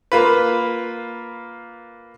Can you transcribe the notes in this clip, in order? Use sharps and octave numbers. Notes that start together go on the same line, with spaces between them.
A#3 F4 B4